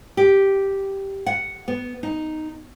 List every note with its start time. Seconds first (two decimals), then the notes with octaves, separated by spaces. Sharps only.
0.17 G4
1.26 F#5
1.68 B3
2.03 D#4